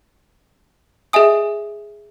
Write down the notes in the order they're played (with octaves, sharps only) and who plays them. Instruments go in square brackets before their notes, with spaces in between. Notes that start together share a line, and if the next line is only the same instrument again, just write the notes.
[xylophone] G#4 D#5 E5 G#5 D#6